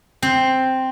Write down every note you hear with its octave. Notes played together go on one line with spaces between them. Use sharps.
C4